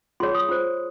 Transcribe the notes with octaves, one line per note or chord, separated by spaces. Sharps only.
F4 G#4 C#5 C6
D#6
F4 C5